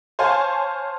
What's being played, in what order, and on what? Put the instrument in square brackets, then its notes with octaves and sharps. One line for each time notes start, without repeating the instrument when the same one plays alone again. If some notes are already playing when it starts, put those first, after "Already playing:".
[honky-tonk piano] C5 C#5 F5 G#5 A5 C6